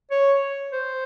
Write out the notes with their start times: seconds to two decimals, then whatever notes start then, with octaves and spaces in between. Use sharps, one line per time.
0.11 C#5
0.73 C5